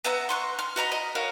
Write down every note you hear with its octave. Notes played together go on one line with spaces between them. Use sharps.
B3 E5 F#5 A#5
C6 C#6 F#6
F6
F#4 D#5 A#5 B5
D#5
F#4 A#4 C#5 F5